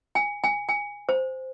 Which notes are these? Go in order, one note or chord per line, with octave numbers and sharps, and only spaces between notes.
G#5
G#5
G#5
C5